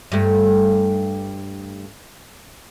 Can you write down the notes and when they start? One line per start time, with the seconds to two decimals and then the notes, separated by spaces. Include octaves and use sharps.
0.12 G2 A3